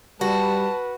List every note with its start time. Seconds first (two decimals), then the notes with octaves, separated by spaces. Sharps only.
0.21 G3 F#4 B4 A5